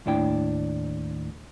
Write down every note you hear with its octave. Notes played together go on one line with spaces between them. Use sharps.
D#2 A2 D4 E4 G5